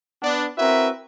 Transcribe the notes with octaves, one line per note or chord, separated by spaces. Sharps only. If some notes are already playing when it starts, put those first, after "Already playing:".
B3 D4
C4 E4 F#4 A#4 B4 E5